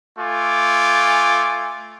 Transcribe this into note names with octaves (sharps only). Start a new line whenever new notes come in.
A3 F4 G#5 D6